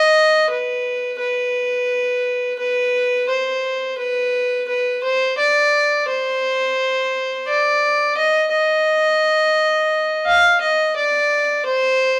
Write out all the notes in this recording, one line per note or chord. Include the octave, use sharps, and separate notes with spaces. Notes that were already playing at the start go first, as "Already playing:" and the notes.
Already playing: D#5
B4
B4
B4
C5
B4
B4
C5
D5
C5
D5
D#5
D#5
F5
D#5
D5
C5